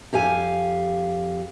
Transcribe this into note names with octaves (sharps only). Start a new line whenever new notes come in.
F2 G4 F5 G#5